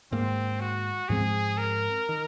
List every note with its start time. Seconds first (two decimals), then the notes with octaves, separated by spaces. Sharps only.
0.11 G#2 D#3 A#3 C4
0.61 F#4
1.09 G#2 F3 G#3 C4 G#4
1.58 A#4
2.09 D#3